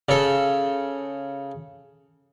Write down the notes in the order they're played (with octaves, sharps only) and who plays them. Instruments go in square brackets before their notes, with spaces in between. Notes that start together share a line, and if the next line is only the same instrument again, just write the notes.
[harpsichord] C#3 A4